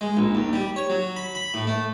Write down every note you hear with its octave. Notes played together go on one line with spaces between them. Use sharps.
G#3
A#1
D#2
G3
C#5
F#3
B5
B5
A2
A3